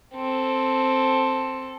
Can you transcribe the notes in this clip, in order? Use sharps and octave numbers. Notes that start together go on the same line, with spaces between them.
C4 A4